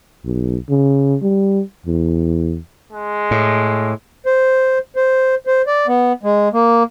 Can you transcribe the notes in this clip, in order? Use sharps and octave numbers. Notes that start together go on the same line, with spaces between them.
B1
C#3
G3
E2
G#3
A2
C5
C5
C5
D5
B3
G#3
A#3